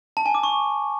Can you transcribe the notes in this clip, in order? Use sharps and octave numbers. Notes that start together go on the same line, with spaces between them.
A5
G#5
D6
C#6